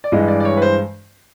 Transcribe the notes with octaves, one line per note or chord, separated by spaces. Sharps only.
D5
G2 E3 G#3 D#5
D5
D5
C#5
B4
C5